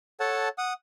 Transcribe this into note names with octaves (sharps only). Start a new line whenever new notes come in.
A4 C#5 F#5 A5
F#5 D#6